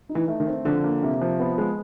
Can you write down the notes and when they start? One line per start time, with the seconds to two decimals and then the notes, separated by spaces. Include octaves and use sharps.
0.09 D#4
0.15 E3
0.28 A3
0.40 D#3
0.47 C4
0.64 D3 F3
0.84 A#3
1.03 C3
1.21 F3
1.40 B3
1.58 G#3